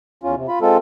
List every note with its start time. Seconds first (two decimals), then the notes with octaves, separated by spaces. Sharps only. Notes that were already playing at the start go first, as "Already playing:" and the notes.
0.23 E2 C#4 F4
0.35 C3
0.48 F4 B5
0.61 G#3 C4 F4 A4